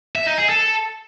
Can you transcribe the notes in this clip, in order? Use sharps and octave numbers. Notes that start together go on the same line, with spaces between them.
E5
D#4
G#4
A4